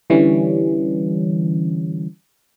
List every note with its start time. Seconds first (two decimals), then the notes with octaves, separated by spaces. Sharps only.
0.10 D3 E3 G3 C#4